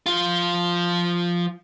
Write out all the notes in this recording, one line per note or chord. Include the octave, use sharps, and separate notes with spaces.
F3 F4